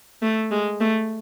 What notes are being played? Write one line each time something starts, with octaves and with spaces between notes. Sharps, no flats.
A3
G#3
A3